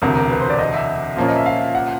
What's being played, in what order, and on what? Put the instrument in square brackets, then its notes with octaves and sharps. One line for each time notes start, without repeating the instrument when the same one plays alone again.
[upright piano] E1 D2 C3 [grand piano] A#4
[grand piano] A#4
B4
C5
D5
D#5
E5
[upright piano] A#2 F3 A#3 C#4
[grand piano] D#5
E5
F5
F#5